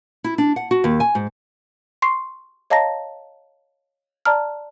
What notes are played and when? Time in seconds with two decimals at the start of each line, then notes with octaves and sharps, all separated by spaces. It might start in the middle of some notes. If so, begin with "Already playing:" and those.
0.24 E4
0.38 D4
0.56 F#5
0.71 F#4
0.84 D#2
1.00 G#5
1.15 G#2
2.02 C6 C#6 C7
2.70 C#5 D#5 F5 A5 A#5 A#6
4.26 D5 A5 A#5 F6